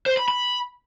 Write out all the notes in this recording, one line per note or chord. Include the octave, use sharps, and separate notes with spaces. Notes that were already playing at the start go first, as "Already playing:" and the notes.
C5
B5
B5